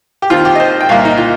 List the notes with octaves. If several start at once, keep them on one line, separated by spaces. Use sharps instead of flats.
G4
D#2 D#3 C4 F4
G4
D#5
C5
G5
C2 A#2 A#3 F5
D#4
F4